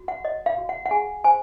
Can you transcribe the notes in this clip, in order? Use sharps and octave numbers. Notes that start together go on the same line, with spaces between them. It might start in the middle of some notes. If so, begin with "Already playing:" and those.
Already playing: F#4
F#5
C#5 D#5
F5
F#4
F#5
F#5
G#4 G#5
C5 G#5